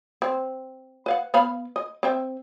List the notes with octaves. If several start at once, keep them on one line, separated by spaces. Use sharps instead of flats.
C4
B4 F5 F#5
B3 F5 B5
D#5
C4 E5 G5